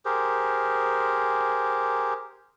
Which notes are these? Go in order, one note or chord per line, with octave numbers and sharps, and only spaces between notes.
G4 G#4 A#4 C5